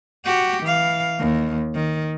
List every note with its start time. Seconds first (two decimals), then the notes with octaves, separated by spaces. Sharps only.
0.25 F#4 G4
0.63 E3 F5
1.19 D#2
1.75 D#3